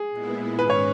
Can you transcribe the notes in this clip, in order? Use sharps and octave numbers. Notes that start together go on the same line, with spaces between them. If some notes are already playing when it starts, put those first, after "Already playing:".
Already playing: G#4
A#2 G#3 B3 E4
G#2 D#3 G#3 C#4 B4
C#5